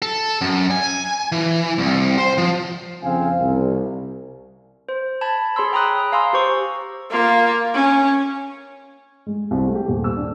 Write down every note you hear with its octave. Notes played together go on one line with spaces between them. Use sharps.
A4
F#2
G#5
E3
C2
C5
F3
F2 C#3 C4 F5 G#5
C2
C5
A5 B5 G#6
G#4 C#5 B5 C6 E6
G5 A#5 B5 D#6 F#6
F5 G#5 A#5 C6 D#6 E6
G4 C5 C#6
A#3 F4
C#4
G#3
C2
A3
G4
D#1
E6
D4